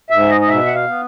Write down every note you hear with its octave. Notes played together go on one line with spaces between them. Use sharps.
G#2 E5
D#5
D#5
B2 E5
F#5
F5
B3